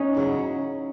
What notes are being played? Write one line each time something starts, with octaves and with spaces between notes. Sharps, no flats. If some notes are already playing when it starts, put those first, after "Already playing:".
Already playing: C#4 D#4
E2 C#3 F#3